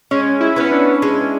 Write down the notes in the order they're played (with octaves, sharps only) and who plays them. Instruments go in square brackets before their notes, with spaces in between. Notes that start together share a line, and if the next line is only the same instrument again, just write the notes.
[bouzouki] G#3 [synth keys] C#4
[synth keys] E4
[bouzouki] B3 F#4 B4 [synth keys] C#4
[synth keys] D4
[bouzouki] G#3 [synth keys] C#4